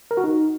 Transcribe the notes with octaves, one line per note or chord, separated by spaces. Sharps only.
A#4
F#4
D#4